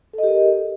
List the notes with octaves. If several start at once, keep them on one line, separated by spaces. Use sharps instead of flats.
G4 A4 A#4 D#5